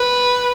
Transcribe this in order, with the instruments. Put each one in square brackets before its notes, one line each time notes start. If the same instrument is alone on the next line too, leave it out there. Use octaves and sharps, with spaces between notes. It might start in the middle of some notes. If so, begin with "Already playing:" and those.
Already playing: [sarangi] B4